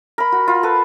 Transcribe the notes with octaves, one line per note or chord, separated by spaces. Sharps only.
A#4 B5
F#4
F4
A4 B4